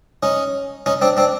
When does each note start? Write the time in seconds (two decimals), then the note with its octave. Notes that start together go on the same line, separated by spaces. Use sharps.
0.23 C#4 D#4
0.86 C#4 D#4
1.02 C4 D4
1.17 C4 D4